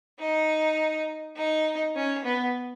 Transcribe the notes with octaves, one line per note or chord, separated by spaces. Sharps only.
D#4
D#4
C#4
B3